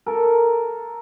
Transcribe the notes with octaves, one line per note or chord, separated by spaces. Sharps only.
A4 A#4